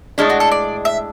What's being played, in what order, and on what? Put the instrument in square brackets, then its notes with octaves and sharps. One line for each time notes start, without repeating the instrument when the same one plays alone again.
[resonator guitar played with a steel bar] A2 G#3 D4 [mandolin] C#4
[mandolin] F#4
A4
D5
E5